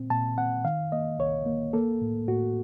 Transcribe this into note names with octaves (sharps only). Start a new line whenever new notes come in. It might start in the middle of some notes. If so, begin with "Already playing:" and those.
Already playing: A#2 C4
A#2 A5
C4 F#5
D#3 F5
A#3 D#5
C2 C#5
A#3
A#3 A4
A2
A2 F#4